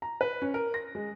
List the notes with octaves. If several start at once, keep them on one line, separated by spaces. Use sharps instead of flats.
A#5
B4
C#4
A#4
A#6
G#3